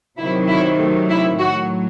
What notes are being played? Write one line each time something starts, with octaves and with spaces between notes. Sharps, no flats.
C3 D#3 F#3 E4
E4
A3
E4
A2 F#3 F#4